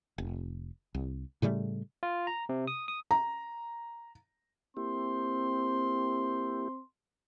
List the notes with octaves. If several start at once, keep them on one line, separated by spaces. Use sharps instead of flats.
F1
C2
A2 C#3 G3 A3
F4
A#5
C3
D#6
D#6
A#5
A#3 C4 E4 G4 C6